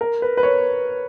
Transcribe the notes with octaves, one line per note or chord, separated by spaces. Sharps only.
A#4
B4
B4
C#5